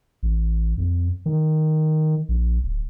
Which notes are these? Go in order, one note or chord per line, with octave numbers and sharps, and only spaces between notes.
A1
F2
D#3
A#1
D1